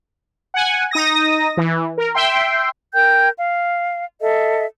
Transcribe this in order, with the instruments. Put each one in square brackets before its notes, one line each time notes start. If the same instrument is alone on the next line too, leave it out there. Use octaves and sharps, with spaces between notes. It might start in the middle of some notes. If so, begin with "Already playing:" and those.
[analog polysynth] F#5 G#5
D#4 D#6 A#6
E3
A#4
E5 G5 C6
[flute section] A#4 G5 G6
F5
A4 D#5 E5